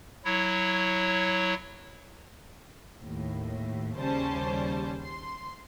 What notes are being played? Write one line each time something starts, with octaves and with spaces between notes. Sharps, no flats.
F#3 E4 C#5
D#2 A2
D#2 C#3 G3 C#4 C5 A5
C6